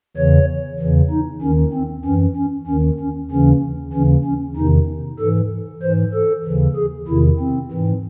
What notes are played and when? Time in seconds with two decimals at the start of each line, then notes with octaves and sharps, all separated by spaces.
0.17 E2 C#3 E3 C#5
0.79 E2 C#3 E3
1.10 D#4
1.42 D#2 D#3 C#4
1.73 C4
2.05 F#2 E3 C#4
2.37 C#4
2.67 D#2 D#3 C#4
3.00 C#4
3.31 D#2 C#3 E3 C#4
3.93 D#2 C#3 E3 C#4
4.25 C#4
4.56 E2 C3 D#3 D#4
5.20 G#2 E3 A4
5.82 G#2 E3 C5
6.14 A4
6.45 D#2 C#3 E3
6.76 G#4
7.08 E2 C3 D#3 E4
7.40 C4
7.72 G#2 E3